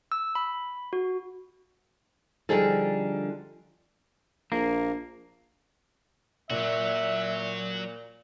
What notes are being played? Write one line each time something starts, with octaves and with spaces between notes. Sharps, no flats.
E6
B5
F#4
D3 F3 G3 D#4 G#4 A4
A#1 A#3
A#2 F#3 F#4 E5